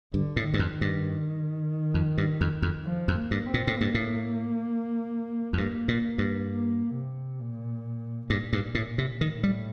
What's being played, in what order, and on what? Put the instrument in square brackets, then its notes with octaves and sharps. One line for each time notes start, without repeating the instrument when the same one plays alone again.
[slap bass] G2 [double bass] D3
[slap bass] A2
[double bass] D#3
[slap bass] G2
F2
[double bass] D#3
[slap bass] G2
F2
G2
F2
F2
[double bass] F3
[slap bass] F2
[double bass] A#3
[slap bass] G2
[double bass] C4
[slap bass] A#2
A2
[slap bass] G2 [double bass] A#3
[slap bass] A2
F2
[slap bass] G2 [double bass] A#3
[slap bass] A#2
G2
[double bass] A#3
C3
A#2
[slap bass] G2 [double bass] A#2
[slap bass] G2
A2
C3
[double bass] A2 [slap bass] D#3
[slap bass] G3